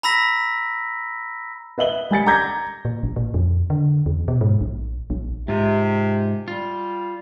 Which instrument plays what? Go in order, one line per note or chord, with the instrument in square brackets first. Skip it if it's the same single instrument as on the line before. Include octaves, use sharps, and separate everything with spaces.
[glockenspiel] A#5 B5 E6 A#6 B6
[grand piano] B4 D#5 E5 F#7 G7
G3 G#5 A6 C#7
A#5 D6 G6 G#6 A#6
[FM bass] A#2
A1
A#2
F2
D3
E2
B2
G#2
A#1
A#1
[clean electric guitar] G#2 F4 [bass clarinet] C3
[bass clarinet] G3 [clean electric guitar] F4